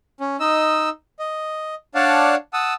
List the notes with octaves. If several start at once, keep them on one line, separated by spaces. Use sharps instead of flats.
C#4
D#4 D#5 E6
D#5
D4 C#5 D5 F5 F#5 A5
F#5 A5 D#6 E6